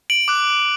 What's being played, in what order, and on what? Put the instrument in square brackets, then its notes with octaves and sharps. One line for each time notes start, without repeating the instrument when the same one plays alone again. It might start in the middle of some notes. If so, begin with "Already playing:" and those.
[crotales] D7 F#7
D6 F#6